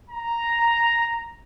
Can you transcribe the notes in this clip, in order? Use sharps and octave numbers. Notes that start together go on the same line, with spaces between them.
A#5